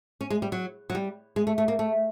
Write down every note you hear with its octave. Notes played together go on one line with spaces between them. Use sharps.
C#4
G#3
G3
F#3
F#3
G3
G#3
A3
A3
A#3
A3